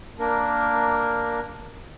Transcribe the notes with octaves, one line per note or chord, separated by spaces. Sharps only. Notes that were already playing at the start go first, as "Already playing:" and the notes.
A#3 D4 A#4